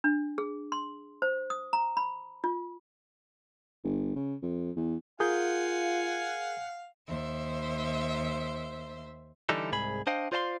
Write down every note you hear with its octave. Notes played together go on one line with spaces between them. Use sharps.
D4
G#4
C6
C5
D#6
A#5
B5
F4
G1
C#3
F2
E2
F4 G#4 A#4 F5 F#5 G#5 G6
D#2 C5 E5
D3 E3 G3 D4 D#4 A4
C2 G#2 G#4 B5
D4 C5 D#5 F5 G5
F4 C5 D5 F5 A5 C6